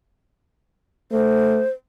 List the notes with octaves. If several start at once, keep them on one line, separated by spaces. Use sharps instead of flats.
A3 C5